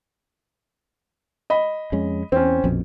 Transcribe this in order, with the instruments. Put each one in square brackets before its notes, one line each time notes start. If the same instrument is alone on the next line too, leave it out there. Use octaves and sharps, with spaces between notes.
[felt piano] D#5 B5
[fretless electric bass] F2 G#3 C#4
[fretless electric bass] E2 [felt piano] C4 C#4
[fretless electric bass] A#1 F2 B2